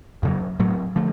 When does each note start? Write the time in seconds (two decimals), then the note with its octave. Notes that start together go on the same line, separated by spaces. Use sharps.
0.23 F2 C#3 F#3
0.60 A2 F#3 A3
0.96 D3 F3 A3